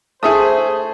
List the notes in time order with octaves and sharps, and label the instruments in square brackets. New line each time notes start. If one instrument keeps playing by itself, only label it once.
[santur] A3 [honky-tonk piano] G#4 E5 D#6 [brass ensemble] C5